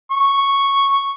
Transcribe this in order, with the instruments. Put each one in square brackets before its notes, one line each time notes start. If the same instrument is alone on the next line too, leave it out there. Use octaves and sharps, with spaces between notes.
[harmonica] C#6